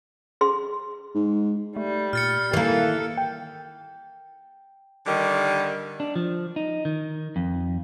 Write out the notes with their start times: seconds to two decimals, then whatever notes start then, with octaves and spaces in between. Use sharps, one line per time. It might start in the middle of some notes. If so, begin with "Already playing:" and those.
0.41 G#4 C6
1.15 G#2
1.76 G3 A3
2.13 A#2 F6 A6 C#7
2.53 D#3 E3 A#3 A4
3.18 G5
5.06 D3 D#3 G3
6.00 D4
6.16 F3
6.56 D#4
6.85 D#3
7.36 F2